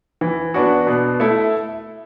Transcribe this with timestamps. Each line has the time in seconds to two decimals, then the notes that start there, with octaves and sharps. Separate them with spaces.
0.21 E3
0.54 B3 D4 F#4
0.87 B2
1.20 A3 E4